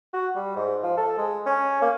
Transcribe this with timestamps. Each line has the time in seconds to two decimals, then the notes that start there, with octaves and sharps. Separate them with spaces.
0.13 F#4
0.35 G3
0.56 G#2
0.83 F3
0.97 A4
1.18 G#3
1.46 C#4
1.81 A#3